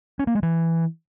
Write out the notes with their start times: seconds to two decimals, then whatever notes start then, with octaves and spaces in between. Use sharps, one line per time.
0.19 C#4
0.27 A#3
0.35 G#3
0.43 E3